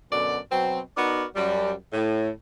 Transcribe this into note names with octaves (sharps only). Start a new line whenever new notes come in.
F#2 B2 D3 D5
B2 F#3 C4
B3 D#4 F#4 A#4 D5
F#2 G3
A2